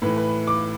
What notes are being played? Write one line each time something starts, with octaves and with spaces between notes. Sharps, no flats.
A2 E3 B4
B4
D6